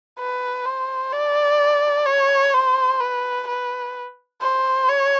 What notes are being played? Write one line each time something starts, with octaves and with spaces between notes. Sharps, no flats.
B4
C5
D5
C#5
C5
B4
B4
C5
C#5